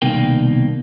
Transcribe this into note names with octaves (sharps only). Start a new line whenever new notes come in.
C2 B2 D#3 A#3 G5